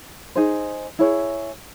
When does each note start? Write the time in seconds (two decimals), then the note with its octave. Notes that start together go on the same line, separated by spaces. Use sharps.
0.35 D#4 G#4 C5
0.99 E4 G#4 C#5